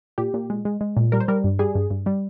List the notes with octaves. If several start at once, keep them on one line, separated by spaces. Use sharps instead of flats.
A#2 G4
A#2
G#3
G#3
G#3
A#2
G3 A#4
C5
G3 A#4
G2
G3 G#4
G2
G2
G3